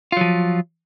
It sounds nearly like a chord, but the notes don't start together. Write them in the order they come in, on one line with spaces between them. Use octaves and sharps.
F4 F#3 F3